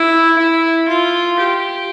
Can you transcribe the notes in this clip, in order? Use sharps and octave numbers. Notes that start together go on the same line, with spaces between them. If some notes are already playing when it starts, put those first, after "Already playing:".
Already playing: E4
E4
F4
G4